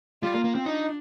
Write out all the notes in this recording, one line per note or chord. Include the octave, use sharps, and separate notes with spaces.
G3 F4
A#3
A#3
C4
D4 D#4